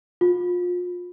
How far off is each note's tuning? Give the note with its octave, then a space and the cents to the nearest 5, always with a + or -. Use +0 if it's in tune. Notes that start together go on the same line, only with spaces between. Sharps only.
F4 +30